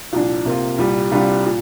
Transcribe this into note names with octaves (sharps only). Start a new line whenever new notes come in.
C2 A#2 F3 D4
C3 A#3 F4
C2 A#2 G3
C2 C3 G3 D4 F4
A#2